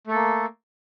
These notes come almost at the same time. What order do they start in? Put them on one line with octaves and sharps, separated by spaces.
A3 A4 A#3